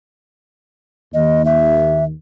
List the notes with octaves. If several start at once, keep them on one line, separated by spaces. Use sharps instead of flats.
D#2 D#5
E5